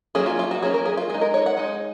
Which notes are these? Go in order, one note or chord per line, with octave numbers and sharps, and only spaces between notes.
F#3 A#3 C#4 G#4
F4
F4
F#4
F#3 A#3 C#4 G#4
A#4
G#4
F4
G#3 D#4 G#4
A#4
C#5
F#5
G#3 D#4